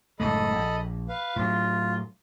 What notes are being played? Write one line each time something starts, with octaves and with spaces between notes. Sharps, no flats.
F#1 A2 G#3 A4 D#5 B5
A#1
B4 F5
A2 F#3 F4